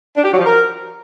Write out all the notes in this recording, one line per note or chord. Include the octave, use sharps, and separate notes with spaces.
D4
G4
F#3
F3
A#4